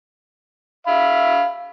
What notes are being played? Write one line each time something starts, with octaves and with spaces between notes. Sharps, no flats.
E5 F5 B5